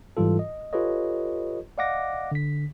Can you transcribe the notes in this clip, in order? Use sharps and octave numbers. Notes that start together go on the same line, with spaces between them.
G#2 E3 G3 F4 A4
D#5
F4 G4 A4 B4 C#5 D#5
D5 D#5 F5 F#5 D6 A#6
D3 B6